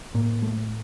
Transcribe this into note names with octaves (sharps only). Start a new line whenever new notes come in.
A2 A#3
A3